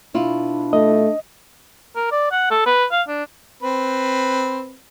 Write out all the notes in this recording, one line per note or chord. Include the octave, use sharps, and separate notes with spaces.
B2 D4 E4 F4
A3 D#5
A#4
D5
F#5
A4
B4
F5
D4
C4 B4